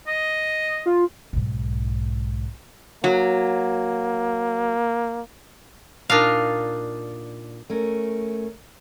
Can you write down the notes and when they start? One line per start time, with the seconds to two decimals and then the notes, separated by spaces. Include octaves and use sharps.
0.07 D#5
0.86 F4
1.33 B1 G#2
3.04 F#3 A#3
6.10 A#2 D4 D#4 F5
7.70 A3 C#4 A#4